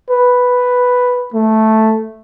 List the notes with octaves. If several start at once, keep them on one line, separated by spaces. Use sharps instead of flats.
B4
A3